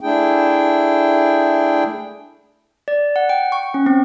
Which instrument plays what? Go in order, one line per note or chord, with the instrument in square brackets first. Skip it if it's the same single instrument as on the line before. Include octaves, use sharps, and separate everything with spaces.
[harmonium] A3 D4 E4 G#4 G5
[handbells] D5
F#5
G5
C#6
C#4
C4